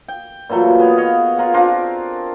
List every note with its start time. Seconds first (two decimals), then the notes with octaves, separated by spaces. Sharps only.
0.08 G5
0.49 A#2 E3 F#3 A3
0.80 B3 G#4 C#5 B5
0.97 C#5 D#5 F5
1.37 F4 A#4 C#5 F#5
1.54 C4 D4 F4 A#4